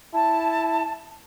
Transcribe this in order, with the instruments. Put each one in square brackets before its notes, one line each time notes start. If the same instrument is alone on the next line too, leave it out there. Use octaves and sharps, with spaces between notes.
[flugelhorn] E4 [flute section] A5